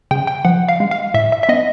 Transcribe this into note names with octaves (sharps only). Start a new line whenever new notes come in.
C#3 G5
G5
F3 F#5
F5
G#3
F5
A2 E5
E5
E5
B3 D#5